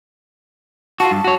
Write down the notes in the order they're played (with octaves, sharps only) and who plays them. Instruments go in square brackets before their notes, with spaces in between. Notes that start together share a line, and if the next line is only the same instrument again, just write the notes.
[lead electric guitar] F4 F#4 [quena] A5
[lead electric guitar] G2
F#4 C#5